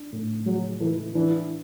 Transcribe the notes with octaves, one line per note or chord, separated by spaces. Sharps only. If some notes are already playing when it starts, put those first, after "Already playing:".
Already playing: D4
A2
F#3 G#3
E3 A4
E3 D4